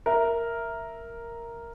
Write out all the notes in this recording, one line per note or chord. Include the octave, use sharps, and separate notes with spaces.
A#4 E5